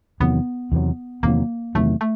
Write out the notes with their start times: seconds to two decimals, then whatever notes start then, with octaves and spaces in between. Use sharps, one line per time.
0.20 E2 C3 D#3 F#3 B3
0.72 E2 C3 D#3 F#3
1.23 E2 C3 D#3 F#3 A#3
1.75 E2 C3 D#3 F#3 A3
2.01 A3